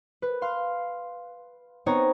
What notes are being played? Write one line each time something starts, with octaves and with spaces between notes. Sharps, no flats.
B4
F5 C6
B3 C4 D#4 C#5 A#5